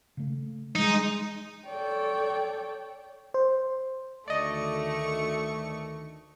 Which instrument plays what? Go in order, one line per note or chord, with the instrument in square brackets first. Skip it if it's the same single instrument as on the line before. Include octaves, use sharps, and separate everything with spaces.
[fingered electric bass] C#3 A3
[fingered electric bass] E3 G3 [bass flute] G#3 [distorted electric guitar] D#4
[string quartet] A4 C#5 D5 G5
[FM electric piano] C5
[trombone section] D2 D#3 [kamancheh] A3 C#6 [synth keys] D5 D#5